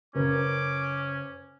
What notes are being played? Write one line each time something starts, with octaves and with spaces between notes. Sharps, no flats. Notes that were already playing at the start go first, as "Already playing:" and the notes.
F#1 C#4 A#4 B4 D6